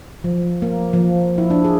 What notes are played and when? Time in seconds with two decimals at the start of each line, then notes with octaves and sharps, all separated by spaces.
0.24 F3
0.62 A#3
0.93 F3
1.38 E4
1.50 D4
1.64 G#4